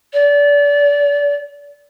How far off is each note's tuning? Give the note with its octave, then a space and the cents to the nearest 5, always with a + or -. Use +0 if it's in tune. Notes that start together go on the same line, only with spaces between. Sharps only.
D5 -30